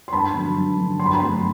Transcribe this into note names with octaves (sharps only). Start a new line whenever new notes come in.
C6
G2 A5 B5
D3 F#3
G2
D3 F#3
G2 C6
B5
A#5 C6
D3 F#3 A3 C4